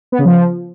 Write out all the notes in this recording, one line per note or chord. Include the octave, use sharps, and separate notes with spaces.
B3
C#3
F3